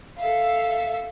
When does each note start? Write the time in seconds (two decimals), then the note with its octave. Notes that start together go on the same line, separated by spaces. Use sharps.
0.17 A4 E5 F5